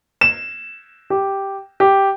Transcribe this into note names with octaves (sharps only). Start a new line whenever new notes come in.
E7
G4
G4